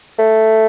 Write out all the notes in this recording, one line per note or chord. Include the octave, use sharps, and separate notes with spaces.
A3